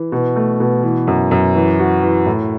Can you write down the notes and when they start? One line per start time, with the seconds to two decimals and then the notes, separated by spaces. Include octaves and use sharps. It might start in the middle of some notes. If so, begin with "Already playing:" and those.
Already playing: E3
0.12 B2
0.36 A3
0.60 B2
0.83 E3
1.08 F#2
1.31 F#2
1.55 E3
1.79 F#4
2.02 E3
2.26 A2